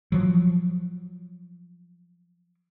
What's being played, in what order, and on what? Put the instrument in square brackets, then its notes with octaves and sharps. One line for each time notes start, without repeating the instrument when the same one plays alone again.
[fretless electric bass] F3 F#3